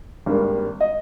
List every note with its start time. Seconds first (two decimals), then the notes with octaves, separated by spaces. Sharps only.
0.26 G#1 G2 G3 A#3
0.81 D#5